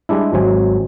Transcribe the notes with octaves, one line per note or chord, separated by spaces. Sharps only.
G3 G#3 D4 E4
G#1 F#3 C4 G#5